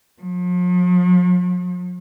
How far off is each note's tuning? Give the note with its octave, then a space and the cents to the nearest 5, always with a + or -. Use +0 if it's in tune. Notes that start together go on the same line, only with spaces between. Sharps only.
F3 +45